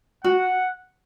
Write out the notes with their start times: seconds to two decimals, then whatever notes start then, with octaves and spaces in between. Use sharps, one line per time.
0.24 F#4 F#5